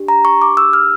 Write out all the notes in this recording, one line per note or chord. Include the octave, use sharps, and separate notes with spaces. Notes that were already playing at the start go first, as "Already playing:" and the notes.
Already playing: D4 G4
A#5
C#6
D6
E6
F6